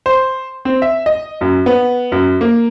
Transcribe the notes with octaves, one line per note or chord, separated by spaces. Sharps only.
C5
C4
E5
D#5
F#2
B3
F#2
A#3